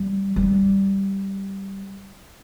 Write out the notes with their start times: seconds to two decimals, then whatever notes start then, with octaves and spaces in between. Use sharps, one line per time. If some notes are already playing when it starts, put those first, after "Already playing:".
Already playing: G3
0.36 G3